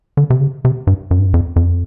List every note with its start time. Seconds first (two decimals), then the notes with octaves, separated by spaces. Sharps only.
0.17 D3
0.30 C3
0.40 C#3
0.65 C3
0.87 G2
1.11 F#2
1.19 G2
1.26 F#2
1.34 F2
1.56 F2